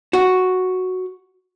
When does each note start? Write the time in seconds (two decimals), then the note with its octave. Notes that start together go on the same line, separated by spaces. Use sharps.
0.13 F#4